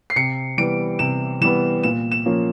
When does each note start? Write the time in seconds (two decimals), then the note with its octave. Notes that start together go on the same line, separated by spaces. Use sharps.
0.10 C7
0.16 C3 C#7
0.58 E3 G3 B3 D7
0.99 C3 E7
1.41 E3 G3 B3 E7
1.83 A#2 E7
2.12 E7
2.26 F3 A#3 C#4